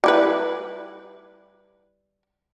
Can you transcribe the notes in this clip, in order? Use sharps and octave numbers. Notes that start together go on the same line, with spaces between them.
G3 E4 B4